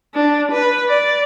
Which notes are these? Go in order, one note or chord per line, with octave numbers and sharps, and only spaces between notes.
D4
B4
D5